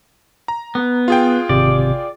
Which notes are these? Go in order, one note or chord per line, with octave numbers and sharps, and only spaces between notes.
A#5
B3
F4 G#4 G5
G#1 C3 D5